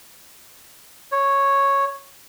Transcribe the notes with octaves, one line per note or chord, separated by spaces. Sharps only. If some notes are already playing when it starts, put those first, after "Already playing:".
C#5